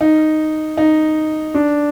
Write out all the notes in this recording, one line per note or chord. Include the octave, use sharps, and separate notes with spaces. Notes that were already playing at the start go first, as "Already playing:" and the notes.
D#4
D#4
D4